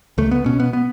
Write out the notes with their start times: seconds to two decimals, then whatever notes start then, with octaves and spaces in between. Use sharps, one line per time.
0.18 C#2 A3
0.31 B3
0.46 B2 C#4
0.60 B3
0.73 B3